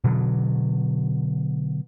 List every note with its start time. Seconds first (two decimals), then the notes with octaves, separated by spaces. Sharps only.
0.04 B2 D3 F#3